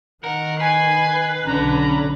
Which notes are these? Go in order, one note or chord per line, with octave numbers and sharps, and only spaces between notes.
D#3 A#4 F#5
B4 G#5 C7
B1 D3 C#4 D4 A#5